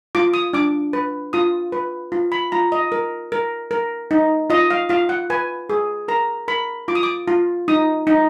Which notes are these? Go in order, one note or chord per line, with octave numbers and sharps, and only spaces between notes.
F4 D6
D#6
D4 D6
B4
F4 D#6
B4
F4
B5
F4 A#5
D#5
A#4
A#4
A#4
D#4
F4 D#5
F5
F4 F5
F#5
B4 G#5
G#4
A#4 A#5
A#4 B5
F4 D6
D#6
D6
F4
D#4 D#6
D#4